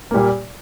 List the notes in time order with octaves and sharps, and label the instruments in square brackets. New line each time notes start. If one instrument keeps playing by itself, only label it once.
[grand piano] A#2 G3 A#3